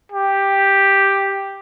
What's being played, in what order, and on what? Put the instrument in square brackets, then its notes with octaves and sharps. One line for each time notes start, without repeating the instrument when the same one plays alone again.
[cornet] G4